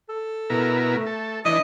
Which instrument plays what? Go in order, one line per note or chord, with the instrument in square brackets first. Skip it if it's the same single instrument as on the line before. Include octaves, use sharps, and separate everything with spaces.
[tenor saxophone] A4
[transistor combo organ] B2 E4 A#4
[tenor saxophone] A3
[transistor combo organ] A4
[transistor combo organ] E3 D4 [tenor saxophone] D#5